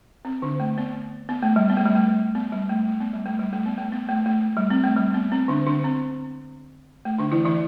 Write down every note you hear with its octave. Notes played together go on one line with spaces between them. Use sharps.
C4
D3 D4
A3
B3
B3
A3
G3
B3
A3
G3
A3
B3
G3
A3
A3
B3
G3
A3
G3
A3
B3
A3
B3
A3
A3
G3
C4
A3
G3
B3
C4
D3 D4
D3 D4
C4
A3
D3 D4
E3 E4
E3 E4